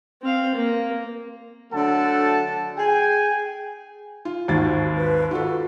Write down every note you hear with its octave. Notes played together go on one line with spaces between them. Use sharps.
C4 F5
A#3
D3 F#3 A3 A4 F#5 A5
G#4 G5 G#5
F4
G#1 D#2 F#4 A6
B4
F4 F#4 A4